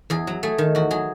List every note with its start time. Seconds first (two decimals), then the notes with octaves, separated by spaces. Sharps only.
0.10 E2 G#4
0.27 F#3
0.43 A3 G#4
0.58 D#3
0.75 E2 F#4
0.91 F#3 G#4